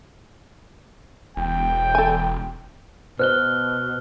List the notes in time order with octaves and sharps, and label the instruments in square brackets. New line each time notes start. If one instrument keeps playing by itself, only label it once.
[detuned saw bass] E1 [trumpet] G5
[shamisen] A4 G#5
[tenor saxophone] B2 [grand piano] C5 [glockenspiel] F6 F#6 G7